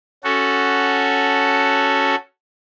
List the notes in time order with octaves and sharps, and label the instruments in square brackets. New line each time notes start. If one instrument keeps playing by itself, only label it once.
[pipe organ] C#4 F#4 A4